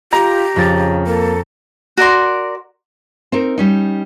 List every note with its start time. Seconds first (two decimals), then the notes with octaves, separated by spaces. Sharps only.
0.13 F4 G4 A#5
0.56 F2 C#3 A6
1.07 A#3 A4
1.97 F#4 A#4 D5 C6
3.32 C4 D#4 A#4
3.58 G3 C#4 D#4